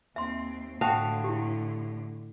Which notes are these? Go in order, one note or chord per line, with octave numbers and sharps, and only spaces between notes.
D#2 C4 E5 C6
A2 D3 F#4 F5 G5 A5 D#6
E4 G4